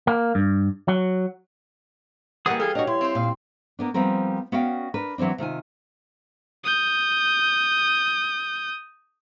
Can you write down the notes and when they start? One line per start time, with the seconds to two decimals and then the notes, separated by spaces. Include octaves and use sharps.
0.07 A#3
0.35 G2
0.88 F#3
2.46 E3 G3 A#3 G#4 B4 F#5 D#6
2.60 G#4 A4 F5
2.75 D4 F#4 C#5 D#5
2.87 E4 C6
3.01 C4 C5
3.15 A#2 F5
3.79 A#3 B3 D4
3.94 F3 G3 B3 C4 A#4
4.52 B3 C#4 F#4 D5 F5 G5
4.94 D4 A#4 B4
5.18 E3 F#3 G#3 C4 D4
5.38 C3 D#3 F4 G#5
6.64 D#6 G6